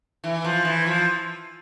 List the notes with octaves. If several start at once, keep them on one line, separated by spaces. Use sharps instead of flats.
E3
F3
E3
F3